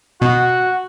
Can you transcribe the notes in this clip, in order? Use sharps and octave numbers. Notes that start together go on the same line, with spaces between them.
B2 F#4